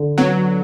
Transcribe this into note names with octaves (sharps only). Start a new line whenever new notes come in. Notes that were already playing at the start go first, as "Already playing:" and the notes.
Already playing: D3
F#3 B3